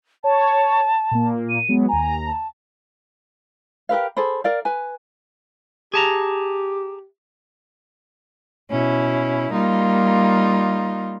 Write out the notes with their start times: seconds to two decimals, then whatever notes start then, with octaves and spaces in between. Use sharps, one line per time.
0.24 C#5 A5
1.11 A#2 A#3
1.49 D#7
1.68 F#3 G#3 B3
1.89 D#2 G#5 A#5
2.27 A5
3.89 G4 A#4 B4 F5
4.17 G#4 A4 C5 B5
4.44 A#4 D5 F5
4.65 B4 G#5
5.94 G4 G#4 A5 A#5
8.70 B2 C#4 E4
9.52 G3 A#3 D#4 F4